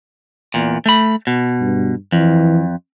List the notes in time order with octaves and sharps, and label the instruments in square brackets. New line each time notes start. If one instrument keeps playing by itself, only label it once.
[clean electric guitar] E2 A#2
A3 B5
B2
[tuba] G2
[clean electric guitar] F2 [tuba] E3